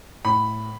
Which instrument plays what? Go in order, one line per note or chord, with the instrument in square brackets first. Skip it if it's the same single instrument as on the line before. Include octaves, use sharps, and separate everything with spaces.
[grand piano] A2 B5